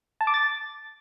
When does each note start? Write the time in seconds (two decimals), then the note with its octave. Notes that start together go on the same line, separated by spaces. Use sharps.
0.21 A5
0.27 D6
0.34 A6